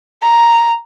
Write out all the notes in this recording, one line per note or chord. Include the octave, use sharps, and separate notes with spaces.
A#5